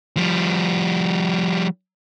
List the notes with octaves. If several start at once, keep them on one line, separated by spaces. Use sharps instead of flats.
F3 G3